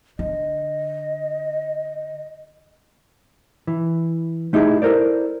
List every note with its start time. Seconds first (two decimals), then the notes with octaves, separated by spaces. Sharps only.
0.19 D3 D#5
3.67 E3
4.53 A3 D#4 E4 G4 G#4
4.82 E4 A4 A#4 C5 D5